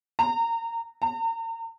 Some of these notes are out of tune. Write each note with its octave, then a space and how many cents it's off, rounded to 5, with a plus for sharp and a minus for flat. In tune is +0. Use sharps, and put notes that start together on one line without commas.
A#5 -25
A#5 -40